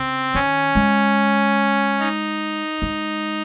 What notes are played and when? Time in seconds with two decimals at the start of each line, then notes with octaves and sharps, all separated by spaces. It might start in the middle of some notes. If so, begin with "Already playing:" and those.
Already playing: C#3 C4
0.35 D#3 C#4
0.75 G#3
2.00 D#4
2.82 G#3